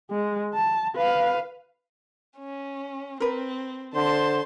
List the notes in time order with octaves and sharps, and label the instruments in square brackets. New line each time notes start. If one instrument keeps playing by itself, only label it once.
[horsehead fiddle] G#3
A5
B4 F5
[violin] C#4
[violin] C4 [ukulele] A#4 B4
[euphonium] D3 [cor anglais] C5 [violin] A5 C6